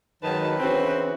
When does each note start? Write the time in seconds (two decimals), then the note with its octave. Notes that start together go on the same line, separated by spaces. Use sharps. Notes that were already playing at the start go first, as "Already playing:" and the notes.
0.23 F#2 D#3 F#3 G#3 B4 A5
0.58 C#3 E3 C4 D4 F#4